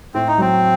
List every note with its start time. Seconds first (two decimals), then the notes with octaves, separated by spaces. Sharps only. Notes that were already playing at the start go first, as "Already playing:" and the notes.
0.14 A2 C4
0.27 D#4
0.38 F#3 C4